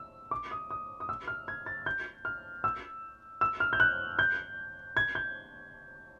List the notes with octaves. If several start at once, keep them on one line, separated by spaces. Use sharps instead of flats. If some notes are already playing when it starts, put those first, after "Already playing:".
Already playing: E6
D6
D#6
D#6
D#6
E6
F6
G#6
A6
G6
F6
E6
E6
F6
G6
F#6
G6
G#6
G6